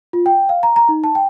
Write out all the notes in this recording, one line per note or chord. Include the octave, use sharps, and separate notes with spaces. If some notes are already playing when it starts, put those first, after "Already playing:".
F4
G5
F5
A#5
A#5
D#4
A5
G5